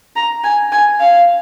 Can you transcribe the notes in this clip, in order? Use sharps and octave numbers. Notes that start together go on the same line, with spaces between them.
A#5
G#5
G#5
F5